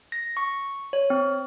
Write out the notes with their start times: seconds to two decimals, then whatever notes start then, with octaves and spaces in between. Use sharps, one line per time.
0.12 A#6
0.37 C#6
0.93 C#5
1.10 C4